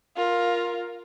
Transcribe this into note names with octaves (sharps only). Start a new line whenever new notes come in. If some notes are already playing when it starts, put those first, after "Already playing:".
F4 A#4